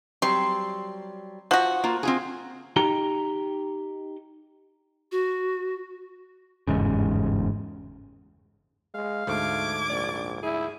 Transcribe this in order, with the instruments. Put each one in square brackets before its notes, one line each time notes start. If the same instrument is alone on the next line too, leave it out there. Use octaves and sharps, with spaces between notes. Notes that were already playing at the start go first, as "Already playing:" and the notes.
[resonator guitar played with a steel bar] F#3 G3 C4 [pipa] C6
[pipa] F3 F#4 [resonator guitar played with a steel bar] F#5
[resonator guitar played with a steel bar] A#3 F4
C4 F4 G#4
[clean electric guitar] D#4 G4 A#5
[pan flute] F#4
[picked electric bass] G1 E2 G#2 C#3
[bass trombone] G#3 [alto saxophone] F5
[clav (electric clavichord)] D2 G#2 [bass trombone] A3 [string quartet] D6 G#6
[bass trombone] A#1 [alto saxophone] D5
[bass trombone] E4 [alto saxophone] G#4